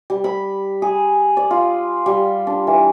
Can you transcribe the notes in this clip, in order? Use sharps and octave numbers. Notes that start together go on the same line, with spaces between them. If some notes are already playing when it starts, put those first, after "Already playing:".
G3
B5
G#4
D5
F4
G3
D4
E3